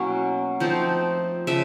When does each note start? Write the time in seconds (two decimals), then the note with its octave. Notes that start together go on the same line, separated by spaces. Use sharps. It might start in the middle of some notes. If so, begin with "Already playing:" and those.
Already playing: B2 F#3 A#3 C#4 E4
0.60 F3 A3 C4 D#4
1.47 C#3 F3 E5